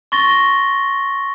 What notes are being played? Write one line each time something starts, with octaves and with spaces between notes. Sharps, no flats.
C6 C#6 A6 A#6 G7